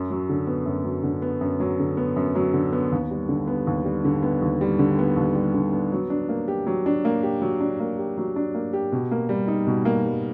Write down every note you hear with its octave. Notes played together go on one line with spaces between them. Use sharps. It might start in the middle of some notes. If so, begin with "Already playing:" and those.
Already playing: F#2
F#3
D3
B3
F#2
F#3
D3
B3
F#2
F#3
D3
B3
F#2
F#3
D3
B3
D#2
G3
D3
B3
D#2
G3
D3
B3
D#2
G3
D3
B3
D#2
G3
D3
B3
F#3
D4
A#3
G4
F#3
D4
A#3
G4
F#3
D4
A#3
G4
F#3
D4
A#3
G4
B2
A#3
G3
D#4
B2
A#3
G3